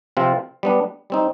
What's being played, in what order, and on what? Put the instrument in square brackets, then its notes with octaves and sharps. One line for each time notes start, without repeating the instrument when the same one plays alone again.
[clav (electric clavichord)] C3 F3 C4 F4
G3 B3 D4
G3 C4 D#4